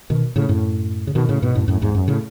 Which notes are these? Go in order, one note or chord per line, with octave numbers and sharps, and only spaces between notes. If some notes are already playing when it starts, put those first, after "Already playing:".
B2 D#3
A2 C#3
F#2 A2
C#3
B2 D#3
A2 C#3
G#2 B2
F#2 A2
F#2 A2
E2 G#2
F#2
A2 C#3